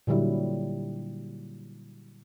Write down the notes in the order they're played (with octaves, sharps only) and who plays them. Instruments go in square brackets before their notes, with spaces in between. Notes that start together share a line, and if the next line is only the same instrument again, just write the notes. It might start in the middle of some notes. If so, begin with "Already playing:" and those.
[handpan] A#2 D3 F#3 G3 E4